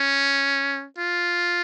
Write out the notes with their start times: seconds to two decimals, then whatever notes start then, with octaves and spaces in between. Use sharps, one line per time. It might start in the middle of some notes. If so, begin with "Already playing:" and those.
Already playing: C#4
0.98 F4